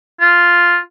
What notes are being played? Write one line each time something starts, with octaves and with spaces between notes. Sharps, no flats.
F4